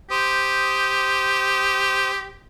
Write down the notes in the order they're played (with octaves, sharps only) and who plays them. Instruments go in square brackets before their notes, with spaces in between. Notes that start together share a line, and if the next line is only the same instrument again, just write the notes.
[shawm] G4 [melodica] C5 D#6